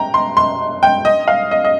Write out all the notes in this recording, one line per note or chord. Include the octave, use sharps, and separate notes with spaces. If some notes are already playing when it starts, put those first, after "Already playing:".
Already playing: G5 A#5
C6
C6
G5
D#5
F5
D#5
D#5